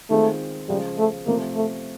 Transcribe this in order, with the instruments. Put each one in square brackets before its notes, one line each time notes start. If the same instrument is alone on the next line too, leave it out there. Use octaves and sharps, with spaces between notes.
[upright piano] D#3 G#3 C4 F4 [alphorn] A3
[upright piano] C#3 F3 G#3 [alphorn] G3
[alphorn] A3
[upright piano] C3 F3 A3 [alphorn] A#3
[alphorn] A3